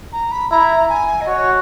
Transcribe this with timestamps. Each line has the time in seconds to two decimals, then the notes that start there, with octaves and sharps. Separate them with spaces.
0.13 A#5
0.31 B5
0.50 E4 A#5
0.89 G#5
1.21 D#5
1.28 F#4 C#5